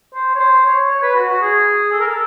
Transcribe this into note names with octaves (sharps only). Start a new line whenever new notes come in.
C5
C#5
C5
C#5
C#5
B4
F#4
F#4
G#4
A4
A#4
A4